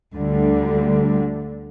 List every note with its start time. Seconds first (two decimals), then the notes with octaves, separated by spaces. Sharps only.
0.14 D2 D3 G3